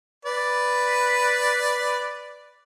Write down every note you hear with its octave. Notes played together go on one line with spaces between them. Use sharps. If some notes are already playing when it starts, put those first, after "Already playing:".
B4 D5